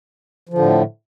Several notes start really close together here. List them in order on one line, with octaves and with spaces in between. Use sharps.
F3 D3 A2